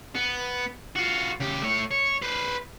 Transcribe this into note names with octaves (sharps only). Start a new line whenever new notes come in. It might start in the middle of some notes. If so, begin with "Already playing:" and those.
B3
F4 F#4
C#3 G4
A3 C#5
C#5
B4 C5